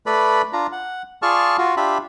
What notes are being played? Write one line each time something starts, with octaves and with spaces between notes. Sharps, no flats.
A3 A4 B4 D5 B5
D4 F4 A#5
F#5
F4 G#4 D5 A5 C#6 F6
F4 F#4
D4 F4 G4 E5 B5